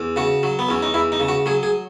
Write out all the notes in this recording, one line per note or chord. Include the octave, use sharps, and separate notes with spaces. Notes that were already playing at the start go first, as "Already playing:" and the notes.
Already playing: E2
C#3 F#4
F#3
B3
E2 C#4
D#4
E2 E4
D#4
C#3
F#4
F#3 G#4
G#4